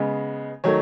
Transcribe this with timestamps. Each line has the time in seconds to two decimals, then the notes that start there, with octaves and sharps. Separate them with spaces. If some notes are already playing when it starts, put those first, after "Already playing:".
Already playing: C#3 G#3 B3
0.64 D#3 F#3 A3 C#5